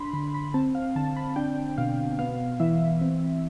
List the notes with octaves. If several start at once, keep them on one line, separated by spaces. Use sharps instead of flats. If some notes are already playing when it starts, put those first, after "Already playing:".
Already playing: D4 B5 C6
D3 B5
B5
C4 A5
F5
D3 A5
B5
D4 G5
B2 F5
B3 F5
E3 E5
C4